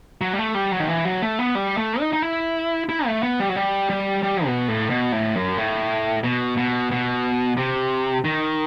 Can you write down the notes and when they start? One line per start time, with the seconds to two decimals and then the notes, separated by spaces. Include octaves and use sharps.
0.21 F#3
0.33 G3
0.38 A3
0.55 G3
0.72 F#3
0.80 D#3
0.88 E3
1.05 F#3
1.22 A3
1.39 B3
1.55 G3
1.77 A3
2.00 D#4
2.13 D#4
2.22 E4
2.89 E4
3.06 A3
3.23 B3
3.40 G3
3.49 F#3
3.56 G3
3.90 G3
4.23 G3
4.46 B2
4.68 A2
4.90 B2
5.12 A2
5.35 F#2
5.58 A2
6.24 B2
6.57 B2
6.92 B2
7.57 C3
8.25 D#3